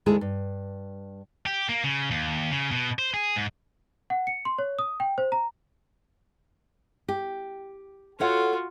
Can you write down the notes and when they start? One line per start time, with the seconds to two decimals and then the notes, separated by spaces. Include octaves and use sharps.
0.06 D2 D#3 G#3 E4 G#4 A5
0.21 G2
1.46 G4
1.69 A#3
1.84 C#3
2.11 D#2
2.51 C#3
2.71 B2
2.99 C5
3.14 G#4
3.36 G#2
4.10 F#5
4.27 C#7
4.45 C6
4.58 C#5
4.79 D#6
5.00 G5
5.18 C5
5.32 A#5
7.08 G4
8.20 F4 F#4 A4 C#5 F#5